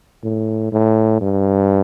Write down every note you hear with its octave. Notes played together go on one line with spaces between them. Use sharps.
A2
A2
G2